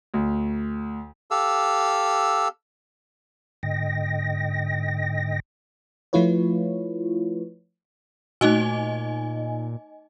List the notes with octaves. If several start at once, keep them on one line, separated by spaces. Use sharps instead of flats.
D2
G4 A4 F5 E6
G#2 D3 D#5 G5 A#6
F3 A3 E4 F4 B4 C#5
A#2 A3 D#4 F#4 D#5 G#5